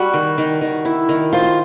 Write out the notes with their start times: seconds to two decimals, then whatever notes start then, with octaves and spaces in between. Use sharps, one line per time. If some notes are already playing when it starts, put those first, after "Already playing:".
Already playing: G3 F#4
0.14 D#3
0.38 D#3
0.61 D#3
0.85 E4
1.09 D#3
1.33 F4 C5